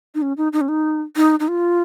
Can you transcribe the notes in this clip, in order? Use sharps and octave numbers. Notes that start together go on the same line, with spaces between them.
D#4
C#4
D#4
D#4
C#4
D#4
D#4
D#4
F4